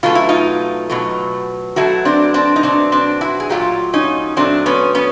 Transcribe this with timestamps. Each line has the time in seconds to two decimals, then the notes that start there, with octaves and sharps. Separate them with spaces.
0.03 B2 F#3 A3 F4
0.15 E4
0.29 D#4 F4
0.90 B2 F#3 A3
1.76 B2 F#3 A3 E4 F#4
2.05 C4 D4
2.34 C4 D4
2.56 D#4
2.63 B2 F#3 A3 C4 D4
2.92 C4 D4
3.21 E4 F#4
3.40 G#4
3.49 A#2 F#3 A3 F4 G4
3.93 C#4 D#4
4.36 A#2 F#3 A3 C4 D4
4.66 B3 C#4
4.95 B3 C#4